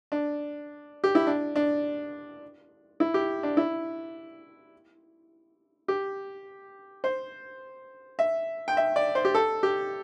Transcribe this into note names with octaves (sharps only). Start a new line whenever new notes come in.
D4
G4
E4
D4
D4
E4
G4
D4
E4
G4
C5
E5
G5
E5
D5
C5
G4
A4
G4